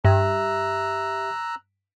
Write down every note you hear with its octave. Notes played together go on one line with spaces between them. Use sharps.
G2 G4 E5 A#5 E6 F#6